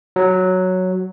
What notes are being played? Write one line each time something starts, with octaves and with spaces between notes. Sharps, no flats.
F#3